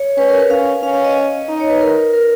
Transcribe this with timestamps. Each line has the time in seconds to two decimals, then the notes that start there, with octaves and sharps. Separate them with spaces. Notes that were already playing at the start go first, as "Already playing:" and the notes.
Already playing: C#5
0.17 C#4 B4
0.29 A#4
0.40 B4
0.50 C#4 F5
0.83 C#4 F5
0.93 F5
1.04 D#5
1.48 D#4 D#5
1.60 C#5
1.70 B4
1.81 A#4
2.14 A#4